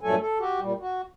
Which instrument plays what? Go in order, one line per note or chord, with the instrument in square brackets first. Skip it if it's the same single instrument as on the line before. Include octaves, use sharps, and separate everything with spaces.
[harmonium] G2 A#2 F#3 A3 A4 G#5
A4
F#4 G4
A#2 G3
F#4